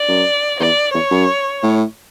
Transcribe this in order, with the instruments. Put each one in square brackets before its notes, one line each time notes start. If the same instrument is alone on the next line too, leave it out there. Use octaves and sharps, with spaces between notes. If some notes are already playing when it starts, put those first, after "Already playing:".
Already playing: [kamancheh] D5
[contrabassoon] F#2
[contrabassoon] E2 [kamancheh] D5
[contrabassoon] E2 [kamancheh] C#5
[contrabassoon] F#2
A2